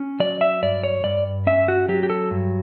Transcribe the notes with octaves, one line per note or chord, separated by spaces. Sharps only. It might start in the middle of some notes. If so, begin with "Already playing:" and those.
Already playing: C#4
F#3 D5
E5
G2 D5
C#5
G2 D5
C#4 E5
F#4
F#3 G4
G4
A4
G2